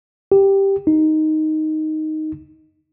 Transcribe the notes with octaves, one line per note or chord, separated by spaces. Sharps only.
G4
D#4